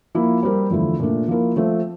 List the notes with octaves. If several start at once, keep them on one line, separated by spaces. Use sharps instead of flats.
F3 A#3 E4
G3 C4 G4 A#4
E2 D3 F3 A3 E4
A#2 A3 D4
F3 A#3 E4 A#4
F3 A3 C4